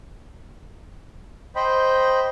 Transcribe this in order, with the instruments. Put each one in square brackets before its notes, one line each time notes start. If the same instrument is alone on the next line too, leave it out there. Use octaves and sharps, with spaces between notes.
[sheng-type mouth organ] C5 D#5 G5 B5